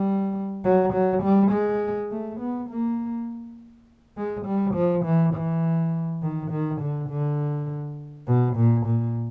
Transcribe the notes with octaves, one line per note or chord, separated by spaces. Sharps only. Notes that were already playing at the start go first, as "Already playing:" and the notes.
Already playing: G3
F#3
F#3
G3
G#3
A3
B3
A#3
G#3
G3
F3
E3
E3
D#3
D#3
D3
D3
B2
A#2
A#2